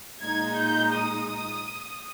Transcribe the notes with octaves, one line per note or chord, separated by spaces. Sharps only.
A#2 G#3 D#4 G#6
G6
D#6